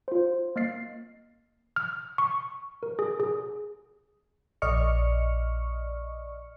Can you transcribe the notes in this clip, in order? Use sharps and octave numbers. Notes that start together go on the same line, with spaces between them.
F4 C5
A#3 D#5 F6 A6 C7
F6
C#6
A#4
G#4
G#4
A#1 D5 D#5 C#6 F6 C#7